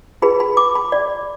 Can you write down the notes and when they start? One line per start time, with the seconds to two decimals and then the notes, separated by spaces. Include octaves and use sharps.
0.22 F4 G#4 B4 B5
0.40 B5
0.57 D6
0.75 B5
0.92 D5